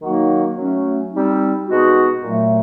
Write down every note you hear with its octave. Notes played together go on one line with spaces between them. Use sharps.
D#3 F#3 A#3 D#4 F#4
F#3 A3 C#4
G3 C4 D#4
B2 G#3 B3 D#4 F#4
A#2 F#3 A3